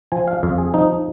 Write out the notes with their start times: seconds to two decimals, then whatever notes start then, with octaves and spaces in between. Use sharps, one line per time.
0.12 F3 G#5
0.28 F5
0.43 F2 F5
0.58 G#4
0.74 F3 D#4